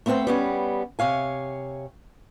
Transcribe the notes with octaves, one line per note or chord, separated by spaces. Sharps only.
A3 B3 C4 C5 G5
G3 B3 C#4
C3 C#5 F5 G#5